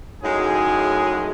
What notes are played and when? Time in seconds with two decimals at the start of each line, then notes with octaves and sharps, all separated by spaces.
0.23 F#2 A2 G#3 D#4 G#4